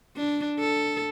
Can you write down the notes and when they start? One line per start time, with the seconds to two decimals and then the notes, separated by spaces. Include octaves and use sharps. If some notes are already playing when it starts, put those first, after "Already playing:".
0.16 D4
0.60 A4